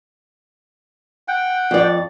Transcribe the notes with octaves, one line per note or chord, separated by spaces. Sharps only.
F#5 G5
F2 D5